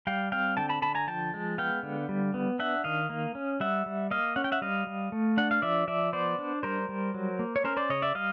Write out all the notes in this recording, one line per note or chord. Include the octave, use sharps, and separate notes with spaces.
G3 F5 G5
C4 F5 G5
D3 G5 A5
A5 B5
D3 A5 B5
G#5 A#5
F3 G5 A5
G#3
B3 F5 G5
D3
G3
B3
D4 E5 F#5
D#3 D#5 F5
A#3
C#4
G3 E5 F#5
G3
A#3 D#5 F5
C#4 F#5
G5
E5 F#5
G3 D#5 F5
G3
A3
D4 F#5
F5
F3 D5 E5
F3 D5 E5
B3 C5 D5
D4
G3 A#4 C5
G3
F#3
A#3
C#5
C#4 A#4 C5
C5 D5
C#3 C#5 D#5
D5 E5
G3 D#5 F5